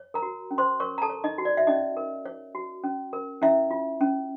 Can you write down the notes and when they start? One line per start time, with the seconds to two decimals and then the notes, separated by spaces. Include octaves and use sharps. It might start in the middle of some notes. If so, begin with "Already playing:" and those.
Already playing: C#5
0.14 A#4 A#5
0.22 F#4
0.51 C#4
0.58 C5 C6
0.80 A#4 C#5 C#6
0.98 A#5
1.02 A4 A5
1.10 C#5
1.24 D#4 D#5
1.38 F#4
1.45 D5
1.57 E5
1.67 C#4 D#4 D#5
1.97 A#4
2.25 C#5
2.55 F#4
2.84 C#4
3.13 A#4
3.42 C#4 E4 E5
3.71 F4
4.01 C#4